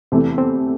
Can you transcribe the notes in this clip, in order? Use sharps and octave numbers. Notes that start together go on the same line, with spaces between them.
E2 C3 E3 A3 C4
C4